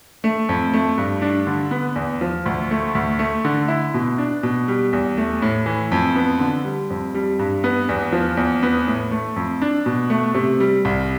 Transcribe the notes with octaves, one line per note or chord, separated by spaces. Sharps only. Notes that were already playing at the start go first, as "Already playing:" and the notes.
A3
F2
A3
G2
D4
D3
B3
E2
F3
D2
A3
D2
A3
D3
E4
B2
D4
B2
G3
E2
A3
A2
E3
F2
B3
D3
G3
F2
G3
G2
B3
E2
F3
E2
B3
A2
A3
F2
D4
B2
A3
C3
G3
C2